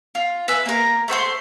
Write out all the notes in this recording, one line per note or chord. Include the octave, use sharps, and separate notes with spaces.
F4
B4 E5 G#5
A#3 A#4
A3 C5 F#5 C6